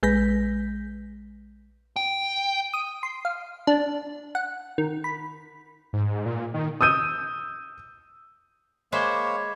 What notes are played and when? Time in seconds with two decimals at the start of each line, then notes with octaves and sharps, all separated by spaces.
0.03 A#1 G#3 B4 G6 A#6 B6
1.96 G5
2.74 D#6
3.03 C6
3.25 F5
3.67 D4
4.35 F#5
4.78 D#3
5.04 B5
5.93 G#2
6.26 A#2
6.54 D#3
6.81 D#6 E6 G6 D#7
8.92 G#3 A#3 C5 C#5 E5 B5 D6 G#6